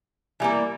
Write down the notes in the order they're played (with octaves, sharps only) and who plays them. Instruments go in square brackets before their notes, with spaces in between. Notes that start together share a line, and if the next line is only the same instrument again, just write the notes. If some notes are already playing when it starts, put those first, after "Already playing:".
[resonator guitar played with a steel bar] E3 G3 A#3